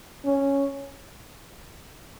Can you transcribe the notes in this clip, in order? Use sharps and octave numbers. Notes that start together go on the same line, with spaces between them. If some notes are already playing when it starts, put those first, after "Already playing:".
C#4